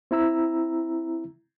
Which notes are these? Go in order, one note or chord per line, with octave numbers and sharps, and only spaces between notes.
C4 E4 A#5 E6